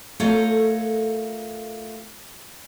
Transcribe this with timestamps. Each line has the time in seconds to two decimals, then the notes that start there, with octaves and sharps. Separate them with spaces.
0.20 A3 F4 A4 A#4 C#5